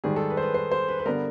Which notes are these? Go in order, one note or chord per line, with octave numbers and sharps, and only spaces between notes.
G#2 D#3 G3 G#4
A4
B4
C5
B4
C5
C5
B4
B4
G2 D3 G3 B3 A#4